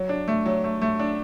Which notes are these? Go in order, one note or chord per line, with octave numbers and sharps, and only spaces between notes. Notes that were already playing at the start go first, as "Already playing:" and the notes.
Already playing: F#3
D4
A3
F#3
A3
A3
D4